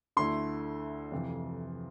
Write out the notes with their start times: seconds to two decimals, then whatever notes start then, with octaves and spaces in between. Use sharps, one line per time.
0.17 D2 D3 A3 E4 C6
1.12 F2 C3 E3